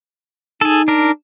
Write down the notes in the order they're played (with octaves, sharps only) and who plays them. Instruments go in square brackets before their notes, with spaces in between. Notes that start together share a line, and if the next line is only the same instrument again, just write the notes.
[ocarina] D#4 [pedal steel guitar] G#4 A4
[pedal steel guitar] D4 A#4